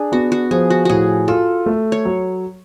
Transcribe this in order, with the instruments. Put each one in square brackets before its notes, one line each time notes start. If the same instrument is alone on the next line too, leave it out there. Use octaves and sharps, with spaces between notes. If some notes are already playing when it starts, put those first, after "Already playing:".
Already playing: [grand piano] D4 [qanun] G#4
[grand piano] B3 [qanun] F#4
[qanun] F#4
[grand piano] F3 [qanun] G#4
[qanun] F#4
[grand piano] A2 [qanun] F#4 G#4
[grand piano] F4 [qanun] A4
[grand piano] A3
[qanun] C#5
[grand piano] F#3